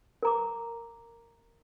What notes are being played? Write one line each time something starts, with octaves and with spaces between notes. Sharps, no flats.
A#4 A#5 D6